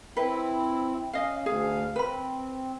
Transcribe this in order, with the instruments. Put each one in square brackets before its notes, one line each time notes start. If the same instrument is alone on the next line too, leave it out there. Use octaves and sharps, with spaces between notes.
[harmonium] C4 E4 [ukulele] B4
[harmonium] C#4 [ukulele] D#5 F5
[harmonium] D2 F5 [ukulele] G#4
[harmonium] C4 [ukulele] B4 B5